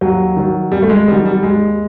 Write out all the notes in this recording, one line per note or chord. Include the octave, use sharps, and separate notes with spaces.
D#2 F#3
D#3 F#3
D#2 G3
A3
G#3
D#3 F#3 G3
G3
D#2 G#3